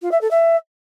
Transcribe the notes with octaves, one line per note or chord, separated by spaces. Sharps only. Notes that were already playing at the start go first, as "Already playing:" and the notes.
F4
E5
A4
E5